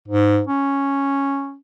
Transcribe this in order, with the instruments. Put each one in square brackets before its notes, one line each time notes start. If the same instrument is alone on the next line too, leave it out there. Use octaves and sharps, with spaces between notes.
[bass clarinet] G#2
C#4